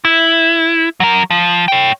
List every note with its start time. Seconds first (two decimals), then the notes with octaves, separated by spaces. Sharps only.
0.05 E4
1.00 F#3 A#4
1.30 F3
1.68 C#5 G5